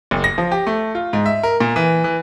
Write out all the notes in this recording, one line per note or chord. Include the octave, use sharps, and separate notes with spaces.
F#1
A#6
F3
G4
A3
F4
G#2
E5
A#4
A#2
E3
E3